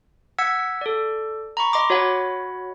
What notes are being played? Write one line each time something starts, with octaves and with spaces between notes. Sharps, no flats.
F#5 E6 G#6 B6 C#7
A4 D5
A#5 B5 C#6
D#5 C6 D6
F#4 C#5 D#5 F#5 B5